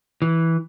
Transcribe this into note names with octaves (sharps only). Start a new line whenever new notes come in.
E3